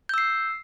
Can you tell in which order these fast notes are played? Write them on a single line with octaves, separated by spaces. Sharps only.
G6 E6 C7